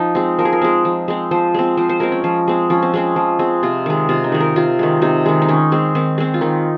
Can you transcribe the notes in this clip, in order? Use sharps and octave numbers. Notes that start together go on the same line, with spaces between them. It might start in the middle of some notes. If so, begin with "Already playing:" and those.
Already playing: F3 D#4
G#3 C4
F3 A#4
G#4
A#4
G#3 C4
F3
G#3 C4
F3 C5
G#3 C4
F3 C5
C5
G#3 C4 A#4
C#4
F3
G#3 C4
F3 C#4
C4
G#3 C4 C#4
F3
G#3 C4
C3 F4
D#3 G#3
C3 F4
D#4
D#3 G#3
A#4
C3 F4
D#3 G#3
C3 D#4
D#3 G#3
D#4
D#3 C#4
G#3 C4
D#3 C4
G#3 C4
F4
D#3 D#4